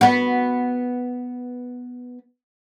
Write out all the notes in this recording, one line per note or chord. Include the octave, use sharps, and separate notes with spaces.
B3 F#4